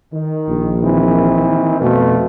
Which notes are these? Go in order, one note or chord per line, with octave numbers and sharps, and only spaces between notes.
D#3
A#1
D#3 E3 C4
F2 B2 A3